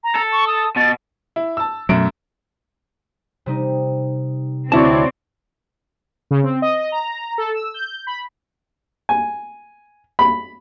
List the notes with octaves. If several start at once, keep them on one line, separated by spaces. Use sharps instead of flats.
A#5
A4
C#6
D#6
B2 A6
E4
A5 E6
F#2 B2 F#3 A3 D7
C3 G3 D#4
D2 C4 E4 F#4 C#5 D5 A5
C#3
C4
D#5
A#5
A4
E6
G6
B5
G#5
B5